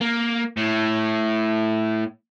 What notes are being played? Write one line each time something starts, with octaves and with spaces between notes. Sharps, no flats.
A#3
A2